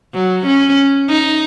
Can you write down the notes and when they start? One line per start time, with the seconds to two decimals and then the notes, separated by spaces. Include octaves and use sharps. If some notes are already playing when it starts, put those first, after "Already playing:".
0.14 F#3
0.46 C#4
1.09 D#4